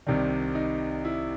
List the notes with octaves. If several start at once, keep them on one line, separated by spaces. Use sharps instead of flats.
C2 C3 D#3 D4
D#4
E4